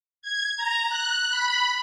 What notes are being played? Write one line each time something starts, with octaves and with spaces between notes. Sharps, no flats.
G#6
A#5
F#6
B5